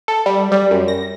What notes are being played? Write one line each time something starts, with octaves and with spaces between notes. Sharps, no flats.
A4
G3
G3
F#2
A#6